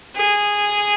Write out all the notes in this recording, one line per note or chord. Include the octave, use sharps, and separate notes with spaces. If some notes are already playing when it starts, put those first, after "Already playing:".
G#4